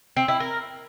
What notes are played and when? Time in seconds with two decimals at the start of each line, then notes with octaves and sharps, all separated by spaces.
0.17 C4
0.28 E4
0.40 A#4